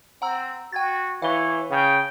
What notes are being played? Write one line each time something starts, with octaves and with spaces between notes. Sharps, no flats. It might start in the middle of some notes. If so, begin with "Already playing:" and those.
C4 F#5 A#5 E6
F#4 G5 G#6 A6
E3 C#5 F5 G7
C#3 G5